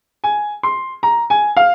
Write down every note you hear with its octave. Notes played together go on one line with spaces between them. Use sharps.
G#5
C6
A#5
G#5
F5